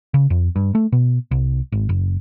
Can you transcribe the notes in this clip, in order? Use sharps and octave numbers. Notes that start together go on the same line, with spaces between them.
C#3
F2
G2
A3
B2
C2
G#1
F#1